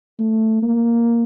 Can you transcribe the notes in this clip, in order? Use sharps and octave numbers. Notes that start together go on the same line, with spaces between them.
A3
A#3